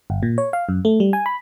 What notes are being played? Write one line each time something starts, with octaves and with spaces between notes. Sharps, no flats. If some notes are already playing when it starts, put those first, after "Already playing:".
G1
A#2
C#5
F5
F#2
A3
G3
G#5
B5